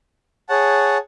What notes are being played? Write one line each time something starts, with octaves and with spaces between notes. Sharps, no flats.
G#4 C#5 F#5 A5